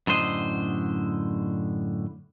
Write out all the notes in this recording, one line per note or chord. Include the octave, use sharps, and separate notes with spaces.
F#2 A2 D3 C5 D#5